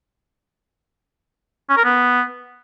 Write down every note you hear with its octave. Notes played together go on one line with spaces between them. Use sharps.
C#4
A#4
B3